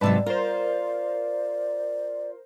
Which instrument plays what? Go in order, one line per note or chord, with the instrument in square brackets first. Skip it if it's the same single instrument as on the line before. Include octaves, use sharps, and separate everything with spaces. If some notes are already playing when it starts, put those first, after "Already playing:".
[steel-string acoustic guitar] G#2 C3 F#3 [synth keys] B4 A5 E6 [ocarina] D5
[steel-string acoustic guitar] F4 [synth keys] A#4 C5